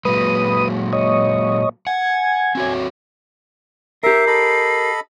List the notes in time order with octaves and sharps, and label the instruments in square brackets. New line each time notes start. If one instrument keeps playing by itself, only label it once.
[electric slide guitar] A#2 F#3 G#3 [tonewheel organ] B4 D#6
[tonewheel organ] C#5 D#5
[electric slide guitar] F#5 [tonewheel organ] G#5
[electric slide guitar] C4 F#4 C#5
[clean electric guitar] G4 A#4 [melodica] E5 [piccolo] C7
[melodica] A4 D#5 B5